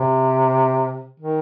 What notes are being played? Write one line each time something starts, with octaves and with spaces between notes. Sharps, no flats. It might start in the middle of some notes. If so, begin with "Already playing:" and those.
Already playing: C3
D#3